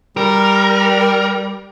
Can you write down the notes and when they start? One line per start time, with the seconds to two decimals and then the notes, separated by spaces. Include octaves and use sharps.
0.17 G3 A#4